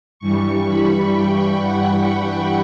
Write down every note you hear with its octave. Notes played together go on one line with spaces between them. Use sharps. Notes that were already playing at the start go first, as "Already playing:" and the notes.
G2 E3 G3 C#6
B5
G5
F#5